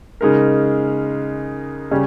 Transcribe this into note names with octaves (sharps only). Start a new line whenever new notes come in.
C#3 G#3 D#4 A#4
C#3 G3 C#4